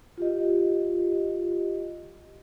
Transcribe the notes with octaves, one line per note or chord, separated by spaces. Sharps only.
F4 G4 D#5